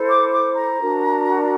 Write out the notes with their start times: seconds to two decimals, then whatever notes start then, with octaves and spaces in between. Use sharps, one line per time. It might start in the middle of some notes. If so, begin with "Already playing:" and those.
Already playing: E4 A4 C5
0.09 D6
0.33 D6
0.56 A#5
0.80 D4 F#4 A#4